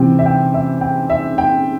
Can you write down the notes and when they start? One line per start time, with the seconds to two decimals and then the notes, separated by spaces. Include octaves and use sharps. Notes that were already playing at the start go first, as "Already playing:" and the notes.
Already playing: C3 E3 C4 G5
0.19 E5
0.26 G5
0.54 E5
0.81 G5
1.10 E5
1.38 G5